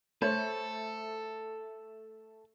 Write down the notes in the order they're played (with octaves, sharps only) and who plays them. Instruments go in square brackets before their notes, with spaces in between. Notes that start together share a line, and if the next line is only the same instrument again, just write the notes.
[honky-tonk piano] A3 [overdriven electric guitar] A4 [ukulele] C5 C#5 B5